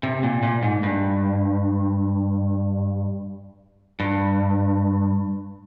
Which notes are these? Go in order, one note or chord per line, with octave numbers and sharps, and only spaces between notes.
C3
A#2
A#2
G#2
G2
G2